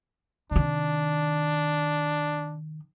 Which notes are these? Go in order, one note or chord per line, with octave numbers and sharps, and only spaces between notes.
C3 D#3 D4